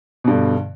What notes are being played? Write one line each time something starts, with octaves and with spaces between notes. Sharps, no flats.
G2 B2 D3